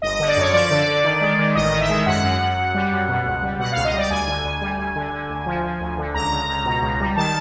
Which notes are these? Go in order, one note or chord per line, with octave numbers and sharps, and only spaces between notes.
G1 D#5
D3 D#5
D5
F#2 C#5
F3 D5
D3
D3
D#3
G#3
D#3
A1 D#5
D#3
E5
G#3
F#2 F#5
F#2
F#2
F#2
G3
F#2
B2
C#2
G3
B2 F#5
C#2 F5
D#5
G3 D5
D2 G#5
D3
D2
G3
D2
D3
D3
D2
F3
F3
D2
D3
C#2 A#5
C#2
C#2
B2
C#2
G3
D#3 A5